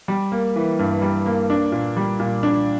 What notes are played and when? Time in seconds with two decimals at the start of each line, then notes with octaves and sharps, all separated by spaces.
0.08 G3
0.32 A#3
0.56 E3
0.79 G2
1.02 G3
1.26 A#3
1.50 D4
1.72 A#2
1.97 G3
2.20 A#2
2.43 D4